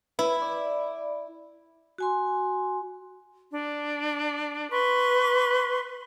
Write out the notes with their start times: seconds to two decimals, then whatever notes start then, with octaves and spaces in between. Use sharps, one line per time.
0.19 E4 B4
0.42 D5
1.98 F#4 G#5 C6
3.51 D4
4.70 B4 C6 C#6